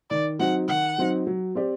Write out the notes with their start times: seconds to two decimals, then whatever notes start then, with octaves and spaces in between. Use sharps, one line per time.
0.10 D#3 D5
0.39 F#3 C4 D#4 F#5
0.68 D#3 F#5
0.98 F#3 C4 D#4
1.27 F#3
1.55 C4 G4 D5